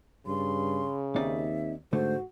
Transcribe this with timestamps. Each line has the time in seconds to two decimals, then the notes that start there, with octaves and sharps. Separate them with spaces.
0.27 G2 C#3 C6
1.16 D#2 C4 D#4 D5 E5
1.93 G#2 D3 A3 F#4 C5